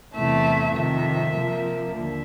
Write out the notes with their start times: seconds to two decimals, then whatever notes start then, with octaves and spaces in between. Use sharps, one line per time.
0.16 E2 C3 E3 A3 E5
0.75 F2 C3 D#3 E5
1.34 C3 F3 A#3
1.93 D#2 D3 E5